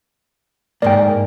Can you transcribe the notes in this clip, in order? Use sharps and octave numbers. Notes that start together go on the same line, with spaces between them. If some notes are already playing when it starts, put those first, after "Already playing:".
G#2 A#3 D5 G5